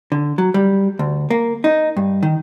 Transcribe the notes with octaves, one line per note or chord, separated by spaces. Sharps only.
D3
F#3
G3
D2
A#3
D#4
G2
D#3